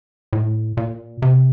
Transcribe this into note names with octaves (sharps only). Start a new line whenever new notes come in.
A2
A#2
C3